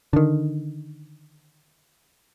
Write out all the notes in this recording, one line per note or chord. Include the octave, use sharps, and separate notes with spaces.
D3 D#3